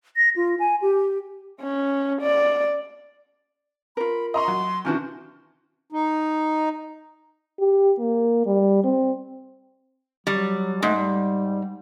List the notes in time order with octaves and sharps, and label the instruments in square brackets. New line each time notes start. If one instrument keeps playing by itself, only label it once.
[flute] A#6
F4
G#5
G4
[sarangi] C#4
D5
[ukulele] F4 A#4 [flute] B5
[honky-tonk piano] D#5 A#5 C#6 [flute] C6
[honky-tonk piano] F#3
[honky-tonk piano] C3 D#3 E3 [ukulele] C#4 D4 F#4
[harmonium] D#4
[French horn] G4
A#3
G3
C4
[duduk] F#3 [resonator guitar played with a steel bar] G3
[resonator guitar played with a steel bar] G#2 [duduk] A3
[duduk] G3